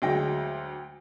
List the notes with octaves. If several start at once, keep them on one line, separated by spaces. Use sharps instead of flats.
D2 F#3 G#3 G5 A#6